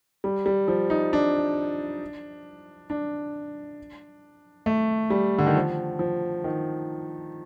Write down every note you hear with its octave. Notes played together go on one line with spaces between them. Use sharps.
G3
G3
F3
D#4
D4
D4
A3
G3
D3
D#3
F3
F3
D#3